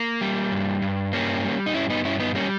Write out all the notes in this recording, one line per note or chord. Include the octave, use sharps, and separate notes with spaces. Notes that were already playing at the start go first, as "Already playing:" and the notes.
Already playing: A#3
G3
G2
G2
G3 A#3 C#4
G3
D#4
G2 C#4 E4
B3 D#4
G2 C#4 E4
B3 D#4
G3 A#3 C#4